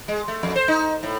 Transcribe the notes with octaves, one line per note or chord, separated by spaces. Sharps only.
G#3
A3
F2
C5
D#4
A2